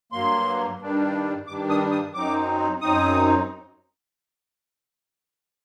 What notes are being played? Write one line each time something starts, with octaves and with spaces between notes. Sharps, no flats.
G2 F#3 A#3 C6
G2 D#3 G3 D4
G2 D#3 G3 D4 D6
D#6
D#6
F#2 F#3 C4 D#4 D6
F#2 F#3 C4 D#4 D#6